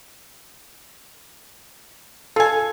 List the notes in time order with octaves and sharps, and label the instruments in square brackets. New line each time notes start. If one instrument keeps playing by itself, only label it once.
[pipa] F4 G#5 [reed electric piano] A4